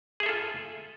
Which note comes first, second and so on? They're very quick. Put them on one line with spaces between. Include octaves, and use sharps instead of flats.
G#4 E5 A4 F4